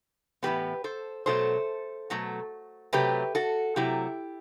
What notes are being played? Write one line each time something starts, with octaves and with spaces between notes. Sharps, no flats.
A2 E3 G3 B3 G4 B4
A4 C5
B2 F#3 A3 A4 C5
B2 F#3 A3
C3 F#3 A3 G4 B4
F#4 A4
C3 F#3 A3 E4 G4